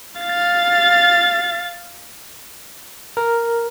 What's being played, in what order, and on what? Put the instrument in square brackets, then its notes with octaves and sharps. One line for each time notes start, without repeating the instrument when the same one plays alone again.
[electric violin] F5 A6
[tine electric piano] A#4